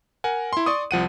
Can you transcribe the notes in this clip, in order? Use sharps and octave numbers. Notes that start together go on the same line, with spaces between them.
A#4 F#5 G#5
E4 C6
D5 C6 C#6 D#6
C2 F3 F#5 D#7